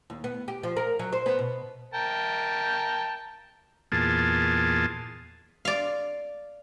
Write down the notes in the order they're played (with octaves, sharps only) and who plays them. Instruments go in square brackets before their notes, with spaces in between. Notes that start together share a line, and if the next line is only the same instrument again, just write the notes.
[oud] D#2
B3
G4
F3
A#4
F#3
C5
B3
B2
[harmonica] A#4 G5 A5
[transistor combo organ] E2 A#2 F4 G#4 A5
[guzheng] D5 F5